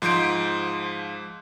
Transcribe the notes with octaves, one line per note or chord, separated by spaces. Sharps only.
G#2 F3 C6 G6 D7